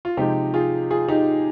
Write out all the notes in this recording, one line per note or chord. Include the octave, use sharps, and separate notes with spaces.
F4
C3 F3 G#3 D#4 G4
F4 G#4
F4 G#4
D#4 G4